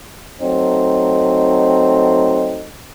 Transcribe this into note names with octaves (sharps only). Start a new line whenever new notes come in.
F#3 A3 C4 D#4